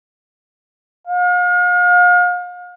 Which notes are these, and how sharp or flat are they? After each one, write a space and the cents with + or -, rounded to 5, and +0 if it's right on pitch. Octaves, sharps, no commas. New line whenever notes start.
F5 +40